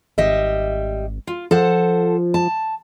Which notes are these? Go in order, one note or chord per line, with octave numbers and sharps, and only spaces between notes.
G#1 G3 D#5 E5
F4
F3 A4 C5 F#5
A5